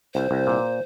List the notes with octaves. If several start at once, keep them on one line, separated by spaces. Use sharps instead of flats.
C2 C5
C2
A#2